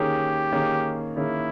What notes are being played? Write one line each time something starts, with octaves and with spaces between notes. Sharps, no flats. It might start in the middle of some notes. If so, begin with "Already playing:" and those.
Already playing: D#3 A#3 C#4 G4 G#4
D#3 A#3 C#4 G#4
D#3 A#3 C#4 E4 G#4